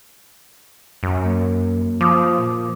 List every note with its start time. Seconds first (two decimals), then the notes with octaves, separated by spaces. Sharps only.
1.03 F#2
1.24 A#3
2.01 F3 D6 D#6
2.38 A#2